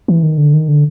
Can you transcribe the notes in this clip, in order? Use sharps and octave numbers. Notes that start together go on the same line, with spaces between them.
E3
D#3
D3
D#3
D3